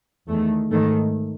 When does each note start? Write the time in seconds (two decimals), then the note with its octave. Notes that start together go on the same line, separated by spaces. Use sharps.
0.28 E2 D#3 A3
0.70 G#2 D#3 A3